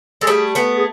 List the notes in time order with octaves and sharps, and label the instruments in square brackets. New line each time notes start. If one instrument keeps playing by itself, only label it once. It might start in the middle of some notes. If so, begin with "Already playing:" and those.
[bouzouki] G#3 [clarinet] A4
[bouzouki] G3 A3 [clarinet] G#4
[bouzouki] A3 B3
[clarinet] G#4